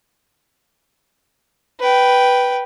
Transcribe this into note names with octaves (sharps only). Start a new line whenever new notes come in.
B4 G5